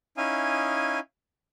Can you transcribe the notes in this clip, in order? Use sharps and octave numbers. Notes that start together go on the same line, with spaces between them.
C#4 D#4 E4 F5 G#5 D#6